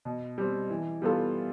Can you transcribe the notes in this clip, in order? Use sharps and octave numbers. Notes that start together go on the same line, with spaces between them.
B2
G3 C4
E3
G3 B3 F4 A4